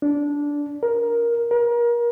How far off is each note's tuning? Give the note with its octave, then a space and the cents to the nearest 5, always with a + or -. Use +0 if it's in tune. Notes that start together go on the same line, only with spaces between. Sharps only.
D4 -15
A#4 +10
A#4 +30